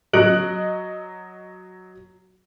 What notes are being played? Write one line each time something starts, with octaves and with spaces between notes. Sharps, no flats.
F#3 D#5 F#6 D7 F#7